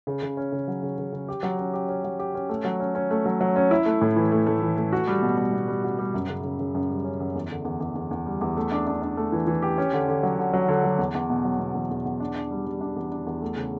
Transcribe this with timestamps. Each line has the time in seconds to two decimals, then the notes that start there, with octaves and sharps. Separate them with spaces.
0.07 C#3
0.23 C#3
0.37 C#4
0.52 C#3
0.68 F#3
0.83 C#3
0.98 C#3
1.13 C#3
1.28 G4
1.43 F#3
1.59 C#4
1.74 G4
1.89 C#4
2.04 F#3
2.19 G4
2.34 C#4
2.49 A3
2.65 F#3
2.80 C#4
2.95 C#4
3.11 A3
3.25 F#3
3.41 F#3
3.56 C#4
3.71 E4
3.86 A3
4.01 A2
4.16 E3
4.32 A3
4.47 A3
4.62 E3
4.77 A3
4.93 F#4
5.07 G3
5.22 B2
5.38 G3
5.53 B2
5.68 G3
5.84 F#4
5.99 G3
6.14 F#2
6.29 C#3
6.44 C#3
6.59 C#3
6.75 F#2
6.89 G3
7.04 C#4
7.20 F#2
7.35 E2
7.50 D3
7.65 E2
7.80 E2
7.95 E2
8.11 E2
8.26 G3
8.41 E2
8.57 A3
8.71 D4
8.87 D4
9.02 D4
9.17 A3
9.32 E3
9.47 E3
9.62 G4
9.78 C#4
9.93 D3
10.08 D3
10.23 F#3
10.38 D3
10.53 F#3
10.68 D3
10.84 F#3
10.99 E2
11.15 E2
11.30 B2
11.45 F#3
11.59 B2
11.75 E2
11.90 E2
12.05 E2
12.20 D4
12.35 D4
12.51 G3
12.66 G3
12.81 D4
12.96 E2
13.12 D4
13.26 E2
13.42 A3
13.57 C#3